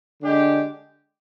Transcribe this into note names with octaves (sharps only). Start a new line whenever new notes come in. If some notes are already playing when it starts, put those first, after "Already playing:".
D3 G#3 D4 G4